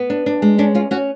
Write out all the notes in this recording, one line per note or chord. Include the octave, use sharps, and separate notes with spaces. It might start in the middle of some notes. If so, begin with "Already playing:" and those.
Already playing: B3
D4
D4
G#3
C#4 D4
C#4 F4
C#4 F#4